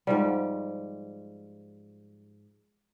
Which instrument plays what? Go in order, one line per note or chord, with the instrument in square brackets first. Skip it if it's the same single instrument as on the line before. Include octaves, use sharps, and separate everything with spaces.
[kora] G#2 F3 G3